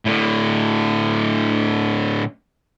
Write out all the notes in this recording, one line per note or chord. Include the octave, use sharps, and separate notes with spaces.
A2 D3